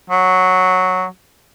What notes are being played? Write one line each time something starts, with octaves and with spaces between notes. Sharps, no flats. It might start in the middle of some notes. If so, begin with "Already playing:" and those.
F#3